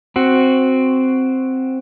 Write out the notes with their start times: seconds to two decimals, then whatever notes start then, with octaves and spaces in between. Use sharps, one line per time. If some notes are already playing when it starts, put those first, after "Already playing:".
0.16 C4 F#4